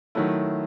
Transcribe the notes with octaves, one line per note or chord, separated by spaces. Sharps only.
D#3 F#3 A3 E4